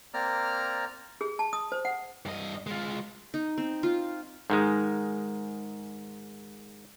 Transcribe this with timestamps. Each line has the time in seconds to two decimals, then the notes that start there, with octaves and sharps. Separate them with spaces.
0.14 A#3 C4 D5 A#5 F6
1.21 G#4
1.39 A5
1.53 D#6
1.72 C5
1.85 F#5
2.26 G2 D#5
2.67 G#3 F4
3.34 D#4
3.58 C4
3.83 F4
4.50 G#2 D#3 G#3